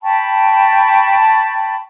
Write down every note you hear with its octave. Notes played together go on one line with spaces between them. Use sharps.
G5 A5 B5 C#6